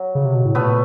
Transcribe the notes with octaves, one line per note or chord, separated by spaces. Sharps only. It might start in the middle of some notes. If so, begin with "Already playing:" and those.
Already playing: F#3
C#3
C3
B2
A2
A#2 A3 B3